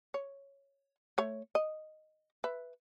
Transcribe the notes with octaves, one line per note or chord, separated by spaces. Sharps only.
C#5
A3 C#5
D#5
B4 E5